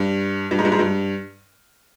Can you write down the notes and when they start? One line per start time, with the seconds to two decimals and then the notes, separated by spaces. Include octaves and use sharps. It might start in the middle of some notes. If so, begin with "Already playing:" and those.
Already playing: G2
0.51 G2
0.59 G#2
0.65 G2
0.72 G#2
0.79 G2